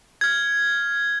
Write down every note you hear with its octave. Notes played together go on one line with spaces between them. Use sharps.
F6 G#6